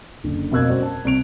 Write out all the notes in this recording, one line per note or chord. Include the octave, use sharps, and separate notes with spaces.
F#1 D3
F2 B2 A#3 E6 F#6 G#6
F#2 G#3 C4 F#4 D5
A5
C2 C3 D7 F7